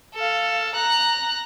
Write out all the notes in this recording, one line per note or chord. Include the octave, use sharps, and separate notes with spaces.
A4 F5
A#5 F#6